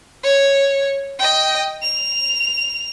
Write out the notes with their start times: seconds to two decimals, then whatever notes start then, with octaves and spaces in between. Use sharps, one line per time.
0.23 C#5
1.19 D#5 G5
1.82 F7